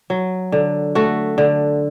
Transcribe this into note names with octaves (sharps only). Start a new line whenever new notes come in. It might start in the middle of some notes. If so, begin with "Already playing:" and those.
F#3
D3
A3 F#4
D3